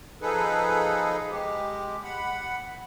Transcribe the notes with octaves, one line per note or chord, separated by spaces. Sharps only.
F3 D#4 G#4 A4 B4
G#3 G4
F#5 B5